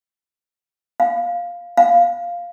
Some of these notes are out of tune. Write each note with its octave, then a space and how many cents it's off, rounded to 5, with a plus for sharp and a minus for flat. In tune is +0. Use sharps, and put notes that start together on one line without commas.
F5 +0
F5 -5